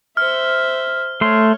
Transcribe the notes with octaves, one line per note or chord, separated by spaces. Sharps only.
C5 E5 F6
A3 C#5 C6